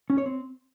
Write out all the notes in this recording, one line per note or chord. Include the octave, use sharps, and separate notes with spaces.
C#4
C#5
C4